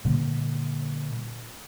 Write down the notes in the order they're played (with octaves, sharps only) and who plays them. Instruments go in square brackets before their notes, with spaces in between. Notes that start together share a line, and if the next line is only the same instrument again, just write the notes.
[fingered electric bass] A#2 D3 G3 A#3